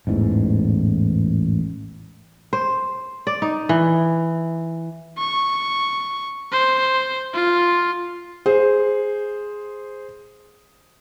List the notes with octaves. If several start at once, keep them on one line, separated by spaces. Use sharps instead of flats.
A1 E2 G#2
C5
D5
D#4
E3
C#6
C5
F4
G#4 C5